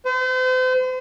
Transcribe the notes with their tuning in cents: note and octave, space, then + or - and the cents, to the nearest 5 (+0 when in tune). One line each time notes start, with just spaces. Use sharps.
C5 -40